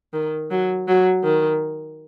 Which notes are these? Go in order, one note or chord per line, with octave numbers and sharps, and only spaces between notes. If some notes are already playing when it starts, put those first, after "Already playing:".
D#3
F#3
F#3
D#3